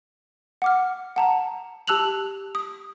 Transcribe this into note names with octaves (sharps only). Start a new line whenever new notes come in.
F#5 D6 F6
F#5 A5 A#5
G4 A5 E6 F#6 F7 F#7
D#6